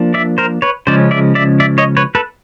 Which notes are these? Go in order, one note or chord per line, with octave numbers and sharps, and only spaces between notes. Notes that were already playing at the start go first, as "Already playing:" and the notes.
Already playing: F3 A#3 D4
D5 E5
A#4 C5
B4 C#5
C#3 F3 G#3 C#4 C5 D5
D5 E5
D5 E5
D5 E5
C#5 D#5
B4 C#5
A4 B4